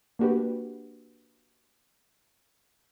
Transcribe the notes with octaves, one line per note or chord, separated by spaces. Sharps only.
A#3 D4 F#4 G4 B4